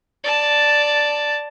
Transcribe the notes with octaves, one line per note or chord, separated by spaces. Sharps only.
D5 A5